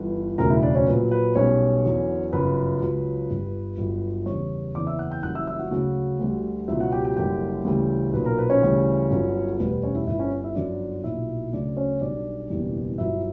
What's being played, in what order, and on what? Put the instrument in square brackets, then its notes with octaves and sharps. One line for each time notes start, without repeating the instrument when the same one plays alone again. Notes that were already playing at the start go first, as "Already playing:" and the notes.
Already playing: [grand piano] G1 G2 E3 B4
E1 D2 C#3 F#3 A#4 A#5
E4 E5
D4 D5
C#4 C#5
A#1 A#2 F#3 B4
B4
B1 B2 G3 C#4 C#5
E2 D3 F#3
G1 F#2 C#3 B4 B5
C#2 C#3 F#3
G1 G2 D3 G3
G1 G2 F#3
E2 C#3 E3 G3 C#5 C#6
F#1 E2 C#3 E3 D5 D6
E5 E6
F#5 F#6
G5 G6
F#1 F#2 E3 G3 F#5 F#6
E5 E6
E5 E6
F#4 F#5
D2 C#3 F#3 F#4 F#5
D2 D3 G3
C#2 B2 F#3 E4 E5
F#4 F#5
G4 G5
G4 G5
F#1 F#2 D3 G3 G4 G5
D2 C#3 E3 G3
B1 A#2 F#3 B4
A#4
B4
C#4 C#5
D2 C#3 E3 G3
G1 G2 D3 F#3
E1 D2 D3 G3 B4
B4
C#4 C#5
E4 E5
G1 G2 D3 E4 E5
C#4 C#5
E4 E5
G1 F#2 D3 F#3 D4 D5
B1 A#2 F#3 E4 E5
D2 C#3 F#3 D4 D5
C#4 C#5
B1 B2 G3 D4 D5
F#1 E2 B2 G3
G1 G2 F#3 E4 E5